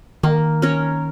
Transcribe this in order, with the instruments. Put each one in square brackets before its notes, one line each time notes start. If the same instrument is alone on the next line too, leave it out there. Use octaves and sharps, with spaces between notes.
[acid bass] D#3 [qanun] A#3
[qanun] C#4 A#4 C#5